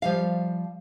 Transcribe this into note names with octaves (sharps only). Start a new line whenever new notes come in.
F3 G3 F5